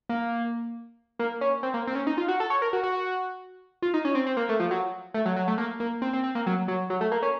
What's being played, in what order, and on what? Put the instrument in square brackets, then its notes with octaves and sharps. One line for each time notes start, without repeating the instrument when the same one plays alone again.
[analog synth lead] A#3
A#3
C#4
C4
A#3
C4
C#4
D#4
F4
F#4
A4
C#5
A#4
F#4
F#4
F4
D#4
C#4
C4
C4
A#3
A3
F3
F#3
A3
F#3
F#3
A3
A#3
A#3
C4
C4
C4
A#3
F#3
F#3
F#3
A3
A#3
C#4